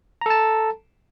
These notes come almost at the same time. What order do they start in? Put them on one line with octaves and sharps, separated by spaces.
A#5 A4 A5